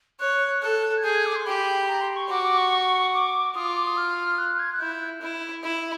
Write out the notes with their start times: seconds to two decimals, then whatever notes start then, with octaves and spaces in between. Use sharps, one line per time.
0.20 C#5 F#6
0.62 A4
0.98 G#6
1.04 G#4 G6
1.14 G#6
1.26 D6
1.36 C6
1.45 G4 B5
1.88 A#5
2.01 C6
2.16 C#6
2.29 F#4 D6
2.43 D6
2.57 C#6
3.14 D6
3.55 F4 D#6
3.65 D6
3.76 D6
3.87 D#6
3.97 F6
4.38 F#6
4.59 G#6
4.72 F#6
4.80 E4 G6
5.22 E4
5.63 E4